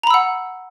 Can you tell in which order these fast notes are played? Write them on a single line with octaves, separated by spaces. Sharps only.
A#5 B5 E6 F#5